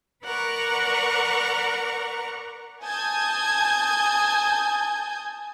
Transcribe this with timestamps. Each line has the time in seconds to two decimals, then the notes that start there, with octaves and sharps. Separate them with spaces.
0.24 A#4 B4 D5 F#5 A#5 C#6
2.83 G#5 A5 D#6 G6 G#6